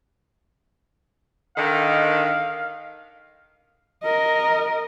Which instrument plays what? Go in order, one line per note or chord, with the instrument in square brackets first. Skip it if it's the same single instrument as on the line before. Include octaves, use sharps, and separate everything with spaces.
[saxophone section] D3 D#3 [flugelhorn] F5
[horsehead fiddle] A#4 D#5